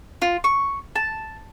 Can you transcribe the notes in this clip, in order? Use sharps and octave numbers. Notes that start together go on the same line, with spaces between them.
F4
C#6
A5